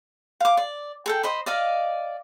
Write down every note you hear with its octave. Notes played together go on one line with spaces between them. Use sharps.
F5 D6
D5
G#4 A4 G5
C5 D#5 B5
D5 D#5 F5